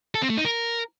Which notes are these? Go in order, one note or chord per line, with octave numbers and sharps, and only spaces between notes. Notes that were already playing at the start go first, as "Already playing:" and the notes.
A4
C4
A3
D#4
A#4